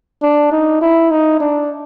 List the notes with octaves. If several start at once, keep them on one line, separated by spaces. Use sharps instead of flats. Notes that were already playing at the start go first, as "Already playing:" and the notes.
D4
D#4
E4
D#4
D4